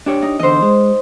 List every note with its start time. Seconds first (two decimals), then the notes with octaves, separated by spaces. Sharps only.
0.06 D4 G4 C#5
0.22 D#4
0.39 E2 D3 C5 D#5
0.62 G#3